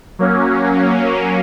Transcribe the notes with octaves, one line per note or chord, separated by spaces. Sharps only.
F#3 A#3 C#4